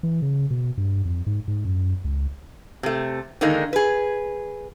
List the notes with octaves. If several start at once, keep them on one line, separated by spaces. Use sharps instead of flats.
E3
C#3
B2
G2
F2
G#2
G#2
F#2
C#2
C3 A3
D3 D#3 G#3 A#3 D#4
G#4 B4